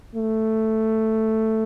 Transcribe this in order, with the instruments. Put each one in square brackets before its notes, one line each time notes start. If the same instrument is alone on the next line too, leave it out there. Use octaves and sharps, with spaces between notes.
[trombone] A3